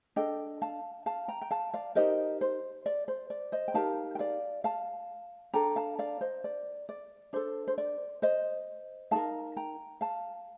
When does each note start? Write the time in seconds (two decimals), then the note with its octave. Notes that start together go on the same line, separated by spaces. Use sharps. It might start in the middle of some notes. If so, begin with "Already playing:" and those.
0.16 D4 A4 D#5 G5
0.62 F5 A5
1.06 F5 A5
1.28 G5 A#5
1.42 G5
1.51 F5 A5
1.74 D5 F5
1.95 D#4 G4 A#4 C5 D#5
2.41 C5
2.86 D5
3.08 C5
3.30 D5
3.52 C5 D#5
3.68 G5
3.74 D#4 G4 A#4 F5 A5
4.15 G5
4.19 D5 F5
4.64 F5 A5
5.54 D4 A4 G5 A#5
5.76 F5 A5
5.99 D5 F5
6.21 C5 D#5
6.44 D5
6.89 D5
7.33 D4 A4 C5
7.67 C5
7.78 D5
8.22 C5 D#5
9.11 D#4 A#4 F5 A5
9.57 G5 A#5
10.01 F5 A5